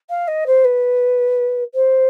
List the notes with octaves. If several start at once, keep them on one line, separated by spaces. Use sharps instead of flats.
F5
D#5
C5
B4
C5